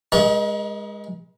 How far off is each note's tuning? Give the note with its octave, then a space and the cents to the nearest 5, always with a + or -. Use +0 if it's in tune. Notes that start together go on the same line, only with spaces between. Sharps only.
G#3 -15 D#4 +35 A#4 +45